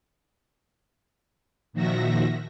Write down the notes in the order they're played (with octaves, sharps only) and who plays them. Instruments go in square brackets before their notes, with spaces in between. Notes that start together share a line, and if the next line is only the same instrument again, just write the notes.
[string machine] A#2 D#3 F3 F#4 E5 A#6